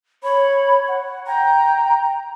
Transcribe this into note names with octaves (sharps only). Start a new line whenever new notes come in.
C#5 B5
F#5
G5 A#5